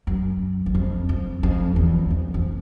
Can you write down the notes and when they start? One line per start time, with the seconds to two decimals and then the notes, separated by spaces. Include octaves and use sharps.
0.07 F#2
0.66 E2
0.75 F2
1.09 F2
1.43 F2
1.76 E2
2.10 F2
2.34 F2